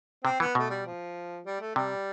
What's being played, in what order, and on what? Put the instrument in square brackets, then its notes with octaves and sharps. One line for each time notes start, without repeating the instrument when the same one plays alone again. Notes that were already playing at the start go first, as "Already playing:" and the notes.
[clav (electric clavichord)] C3 [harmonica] C4
[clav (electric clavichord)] E3 [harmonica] B3
[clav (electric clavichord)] B2 [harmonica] A3
[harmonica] G3
F3
G3
A3
[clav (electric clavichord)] C3 [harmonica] G3